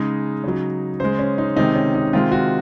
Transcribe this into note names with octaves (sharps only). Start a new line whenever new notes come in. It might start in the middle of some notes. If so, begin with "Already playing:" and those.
Already playing: C#3 G#3 D#4
C#3 F#3
C#3 G#3 C5
C#4
D#4
C3 D#3 G#3 D#4
C#4
D#4
C3 D#3 G#3 F4
F#4